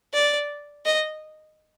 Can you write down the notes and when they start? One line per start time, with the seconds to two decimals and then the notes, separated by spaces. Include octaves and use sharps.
0.13 D5
0.86 D#5